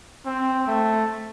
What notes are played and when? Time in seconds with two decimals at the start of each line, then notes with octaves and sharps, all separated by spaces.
0.26 C4
0.67 A3